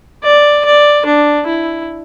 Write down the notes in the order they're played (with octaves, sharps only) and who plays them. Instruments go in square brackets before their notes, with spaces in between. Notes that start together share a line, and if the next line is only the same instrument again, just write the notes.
[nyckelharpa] D5
D5
D4
E4